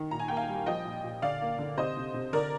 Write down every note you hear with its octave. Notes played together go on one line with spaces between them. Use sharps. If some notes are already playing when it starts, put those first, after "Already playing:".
Already playing: D#3
A#2 A#5
G#5
A#3 G5
F5 G#5
G3
F3 D#5 G5
A#2
A#2
D3 D5 F5
A#3
D3
C3 C5 D#5
C3
C3
D3 A#4 D5